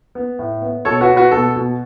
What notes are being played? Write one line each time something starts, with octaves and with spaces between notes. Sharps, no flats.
B3
A2
B3
B2 A4 C#5
F#4 B4
B3
F#4 B4
B2 A4
B2